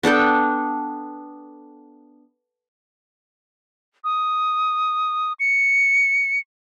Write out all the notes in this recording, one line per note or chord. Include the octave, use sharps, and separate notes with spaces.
B3 D4 A4 G5
D#6
C#7